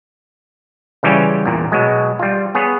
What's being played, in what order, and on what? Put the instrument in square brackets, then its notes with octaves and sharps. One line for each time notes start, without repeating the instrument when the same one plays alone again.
[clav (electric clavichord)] C#3 E3 G3 C#4 F4 G4
E2 A#2
B2 F#3 G#3
G3 F4
B3 G#4 C#5